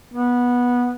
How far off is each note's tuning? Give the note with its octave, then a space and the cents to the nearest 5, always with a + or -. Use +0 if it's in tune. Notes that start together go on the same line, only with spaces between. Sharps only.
B3 -15